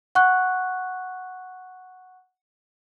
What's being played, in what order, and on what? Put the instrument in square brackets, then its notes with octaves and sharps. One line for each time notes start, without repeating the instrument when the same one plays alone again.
[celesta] F#5 C#6 F#6